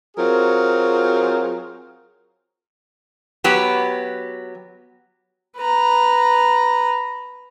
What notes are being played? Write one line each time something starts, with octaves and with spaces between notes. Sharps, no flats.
F#3 C4 F4 F#4 G#4 A#4
F#3 B3 G4
B4 A#5